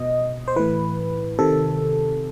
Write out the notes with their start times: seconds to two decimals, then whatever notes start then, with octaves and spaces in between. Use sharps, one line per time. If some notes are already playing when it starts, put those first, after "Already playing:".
Already playing: B2 D#5
0.48 C5
0.56 A2 E3 B4
1.39 C3 D#3 A4